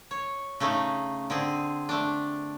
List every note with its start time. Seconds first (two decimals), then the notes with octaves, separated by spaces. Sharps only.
0.11 C#5
0.60 C#3 A3 C#4 D#4
1.30 D3 C4 G#4
1.89 A3 D4